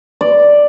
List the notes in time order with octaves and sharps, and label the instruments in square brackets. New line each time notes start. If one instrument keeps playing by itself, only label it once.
[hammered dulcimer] D5